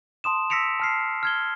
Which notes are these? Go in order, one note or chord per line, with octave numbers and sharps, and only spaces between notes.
A5 C6 D#6 E7
E6 A#6 B6 C#7 D7 F7
A5 F6 C7
F6 G#6 G7